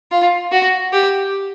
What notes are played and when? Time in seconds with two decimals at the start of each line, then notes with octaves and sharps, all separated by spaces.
0.11 F4
0.52 F#4
0.93 G4